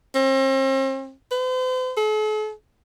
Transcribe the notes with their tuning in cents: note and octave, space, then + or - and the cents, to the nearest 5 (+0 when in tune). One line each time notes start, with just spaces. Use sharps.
C4 +40
C5 -45
A4 -45